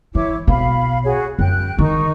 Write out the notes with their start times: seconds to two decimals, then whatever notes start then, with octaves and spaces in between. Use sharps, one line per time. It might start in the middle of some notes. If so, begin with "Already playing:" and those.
0.15 E3 E4 C#5 D6
0.47 B1 B2 F5 B5
1.04 F#4 G#4 C#5
1.39 F#2 G5 F#6
1.79 D#3 D#4 C#6